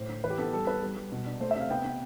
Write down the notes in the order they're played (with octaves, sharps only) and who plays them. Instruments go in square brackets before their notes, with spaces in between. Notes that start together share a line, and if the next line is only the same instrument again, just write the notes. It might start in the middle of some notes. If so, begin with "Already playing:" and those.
Already playing: [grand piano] A2 A3 C5
D3
E3 B4
G4
B3 A4
G3 A4
B3 B4
G3
G3
B2
D4
A3 C5
E5
C3 F5
B3 G5
B3